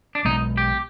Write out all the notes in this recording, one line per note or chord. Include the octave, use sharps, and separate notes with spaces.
D4
B1 B2 G#3 B3 D#4
G4